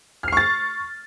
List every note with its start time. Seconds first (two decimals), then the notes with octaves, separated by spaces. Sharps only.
0.23 F6
0.28 C7
0.32 C#6
0.37 A6